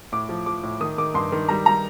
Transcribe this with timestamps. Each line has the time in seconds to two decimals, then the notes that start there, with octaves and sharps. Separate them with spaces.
0.12 A2 D6
0.29 F3
0.46 F3 D6
0.63 A2
0.80 D#3 D#6
0.98 D#3 D6
1.14 G2 C6
1.32 D#3
1.49 G3 A#5
1.66 G3 A#5